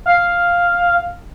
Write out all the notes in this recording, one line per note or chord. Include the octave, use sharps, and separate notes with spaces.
F5